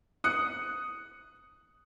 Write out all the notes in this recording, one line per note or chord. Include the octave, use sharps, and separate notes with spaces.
D#6 F#6 C#7